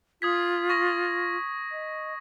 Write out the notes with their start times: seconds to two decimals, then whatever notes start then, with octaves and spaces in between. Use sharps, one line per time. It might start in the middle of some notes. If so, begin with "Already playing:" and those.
0.22 F4 D#6 G#6 B6
0.70 C#6 A#6
1.72 D#5